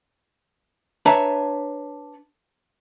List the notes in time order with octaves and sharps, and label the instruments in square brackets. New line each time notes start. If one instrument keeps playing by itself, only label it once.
[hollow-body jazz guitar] D4 B4 C#5 E5 A5 A#5